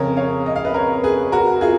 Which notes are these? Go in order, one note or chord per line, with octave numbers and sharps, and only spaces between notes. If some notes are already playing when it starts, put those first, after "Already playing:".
Already playing: F2 C#3 A#4 C#5
C#5 F5
D#5
F5
B4 D#5
A#4 C#5
G#4 B4
F#4 A#4
F4 G#4